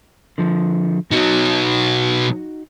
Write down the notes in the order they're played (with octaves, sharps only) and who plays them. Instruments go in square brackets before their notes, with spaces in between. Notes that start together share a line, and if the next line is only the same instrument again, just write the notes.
[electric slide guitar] D3 F3
[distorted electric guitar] B2 F#3 [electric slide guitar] D#4 F#4